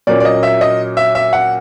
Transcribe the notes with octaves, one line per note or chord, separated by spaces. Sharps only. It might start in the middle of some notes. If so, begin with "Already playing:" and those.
A#2 F#3 A#3 C#4 D5
D5
D#5
E5
D#5
E5
E5
F#5